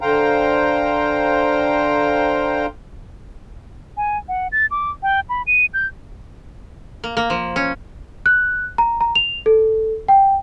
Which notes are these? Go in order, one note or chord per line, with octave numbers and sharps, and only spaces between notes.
D3 C5 F5 G5 A#5
G#5
F#5
A6
D6
G5
B5
D#7
G6
A#3
A#3
F3
C#4
F#6
A#5
A#5
F7
A4
G5